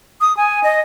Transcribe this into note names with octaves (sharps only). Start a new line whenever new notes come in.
D#6
G#5
D#5